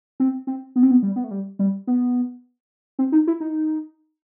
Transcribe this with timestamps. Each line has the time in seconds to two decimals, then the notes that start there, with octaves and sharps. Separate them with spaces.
0.20 C4
0.47 C4
0.76 B3
0.83 C4
0.91 B3
1.03 G3
1.16 B3
1.24 A3
1.31 G3
1.59 G3
1.87 B3
2.99 C4
3.12 D#4
3.27 E4
3.40 D#4